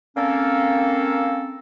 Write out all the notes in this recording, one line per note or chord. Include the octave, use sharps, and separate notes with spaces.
A#3 C4 C#4 A4